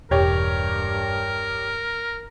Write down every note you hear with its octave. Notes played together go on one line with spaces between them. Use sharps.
E1 G2 G4 A#4 C#5